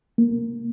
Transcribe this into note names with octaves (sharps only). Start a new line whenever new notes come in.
A#3